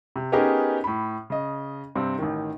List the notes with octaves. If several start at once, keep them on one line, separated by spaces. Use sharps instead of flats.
C3
B3 C#4 D#4 G4 G#4 A#4
A2 B5
C#3 D#5
G2 C3 C4
A1 D#3